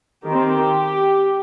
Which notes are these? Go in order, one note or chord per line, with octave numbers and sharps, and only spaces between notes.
D#3 C4 G4